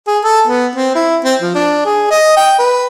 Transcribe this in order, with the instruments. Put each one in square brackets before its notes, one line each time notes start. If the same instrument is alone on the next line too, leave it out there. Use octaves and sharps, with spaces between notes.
[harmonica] G#4
A4
B3
C4
E4
C4
F3
D4
G#4
D#5
G5
B4